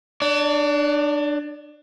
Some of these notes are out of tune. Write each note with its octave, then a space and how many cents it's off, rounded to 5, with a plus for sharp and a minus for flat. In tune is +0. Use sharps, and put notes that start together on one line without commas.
D4 +25 D5 -35